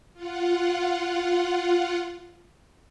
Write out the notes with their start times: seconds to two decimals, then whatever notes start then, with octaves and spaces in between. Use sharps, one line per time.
0.13 F4 F#5